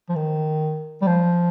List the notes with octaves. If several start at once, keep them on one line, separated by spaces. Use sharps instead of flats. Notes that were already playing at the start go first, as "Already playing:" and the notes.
F3
D#3
G3
F3